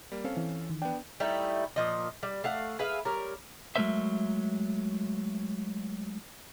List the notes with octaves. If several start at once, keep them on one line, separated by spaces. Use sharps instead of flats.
G3 A#3
C4 C#4 A4 F5
E3
D#3
B3 D4 G5
G3 A3 D#4 E4
A#2 F3 D#5
G3
A3 F5 F#5
G#4 B4 E5 F5
G3 A#4 C#5
F#3 G#3 A3 A#4 C5 E5